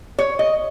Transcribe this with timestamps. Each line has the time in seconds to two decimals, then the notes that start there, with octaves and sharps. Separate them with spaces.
0.19 C#5
0.39 D#5